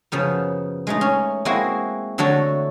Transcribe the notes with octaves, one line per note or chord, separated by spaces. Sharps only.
F#2 C#3 F3 B3
G#3 A3 D#4
C#4
G#3 A#3 C4 E4 F#4
D3 F#3 A3 F#4 A4